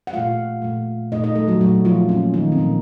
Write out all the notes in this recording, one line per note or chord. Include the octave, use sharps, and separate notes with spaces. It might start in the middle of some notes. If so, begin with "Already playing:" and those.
F#5
A#2 A3 F4 F5
A#2 A3
A#2 A3 D#4 D#5
D#4 D#5
A3 A4
F#3 F#4
A#2 F#3 A3 F#4
F3 F4
A#2 F3 A#3 C#4
D#3 D#4
C4
A#2 F3 A#3 C#4